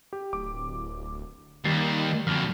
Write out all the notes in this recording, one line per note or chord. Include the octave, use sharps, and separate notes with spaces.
G4
D1 D6
D#2 D#3 G3 A6 C7
F2 B2 D3 F6